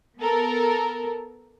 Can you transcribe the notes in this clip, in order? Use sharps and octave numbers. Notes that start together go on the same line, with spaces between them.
B3 A4 A#4